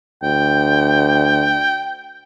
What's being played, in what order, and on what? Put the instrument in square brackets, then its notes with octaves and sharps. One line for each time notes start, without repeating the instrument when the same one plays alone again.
[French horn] D2 [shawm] G5